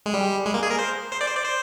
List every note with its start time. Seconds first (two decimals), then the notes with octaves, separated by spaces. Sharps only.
0.06 G#3
0.14 G3
0.46 G#3
0.54 A#3
0.63 G#4
0.71 A#4
0.79 C5
1.12 C5
1.21 D5
1.28 C5
1.37 D5
1.45 C5